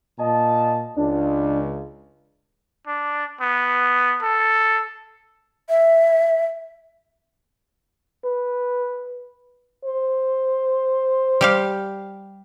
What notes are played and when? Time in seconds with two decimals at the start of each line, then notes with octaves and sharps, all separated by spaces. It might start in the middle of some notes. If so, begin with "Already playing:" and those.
0.19 A#2 D#5 A5
0.96 C#2 D4
2.87 D4
3.41 B3
4.22 A4
5.69 E5
8.25 B4
9.85 C5
11.41 G3 G4 F5